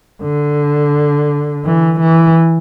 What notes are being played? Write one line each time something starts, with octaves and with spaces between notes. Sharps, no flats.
D3
E3
E3